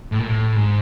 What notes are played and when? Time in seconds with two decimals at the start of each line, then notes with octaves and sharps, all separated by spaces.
0.12 A2
0.19 A#2
0.28 A2
0.56 G#2